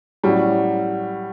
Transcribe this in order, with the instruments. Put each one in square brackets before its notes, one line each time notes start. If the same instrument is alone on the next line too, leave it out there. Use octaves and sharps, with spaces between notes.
[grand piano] A2 F#3 C#4 [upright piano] G3